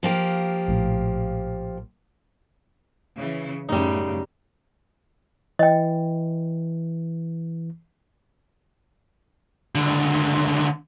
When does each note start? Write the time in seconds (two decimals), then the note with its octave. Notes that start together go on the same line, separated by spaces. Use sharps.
0.03 F3 A#3 G4
0.68 A#1 A2
3.18 C#3 E3
3.69 F#2 A2 C#3 G3 D#4
5.59 E3 D#5 G5
9.75 C#2 D3